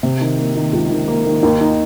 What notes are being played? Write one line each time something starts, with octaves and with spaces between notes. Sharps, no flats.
C3
D#3
A#3
D#3
C#2
D#3
A#3
D#3
D#2
D#4